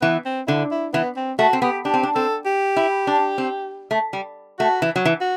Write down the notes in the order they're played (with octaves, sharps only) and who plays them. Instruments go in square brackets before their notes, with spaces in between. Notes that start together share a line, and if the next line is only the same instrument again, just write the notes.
[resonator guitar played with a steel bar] E3 [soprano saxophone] B3
[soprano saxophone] C4
[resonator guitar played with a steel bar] D3 [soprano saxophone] E4
[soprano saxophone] E4
[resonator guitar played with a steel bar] E3 [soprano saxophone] B3
[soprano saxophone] C4
[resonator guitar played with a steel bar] A3 [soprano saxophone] F#4
[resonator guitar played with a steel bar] C4
[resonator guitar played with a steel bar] B3 [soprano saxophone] G4
[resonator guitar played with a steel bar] D4 [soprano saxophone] G4
[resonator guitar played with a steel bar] C4
D4
[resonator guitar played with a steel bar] C4 [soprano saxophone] A4
[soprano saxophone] G4
[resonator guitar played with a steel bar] E4
D4
C4
A3
G3
[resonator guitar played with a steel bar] A3 [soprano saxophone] F#4
[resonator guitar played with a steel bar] E3
F#3
E3
[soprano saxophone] F#4